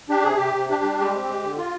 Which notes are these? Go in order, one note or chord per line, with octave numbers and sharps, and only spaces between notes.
D4 G4
C3 G#4
C3 G4
C3
D4 G4
G3
G#3 G4
C4
G#3
D3
F4